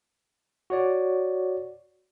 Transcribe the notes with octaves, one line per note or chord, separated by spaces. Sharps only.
F#4 C#5 D5